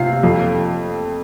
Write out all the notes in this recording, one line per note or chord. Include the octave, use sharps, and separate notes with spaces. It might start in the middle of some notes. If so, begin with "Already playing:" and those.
Already playing: C3 F4 C7
F2